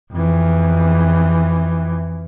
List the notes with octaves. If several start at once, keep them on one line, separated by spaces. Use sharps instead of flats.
F2 E3